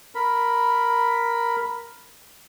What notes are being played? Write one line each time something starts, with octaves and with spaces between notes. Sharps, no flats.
A#4 B5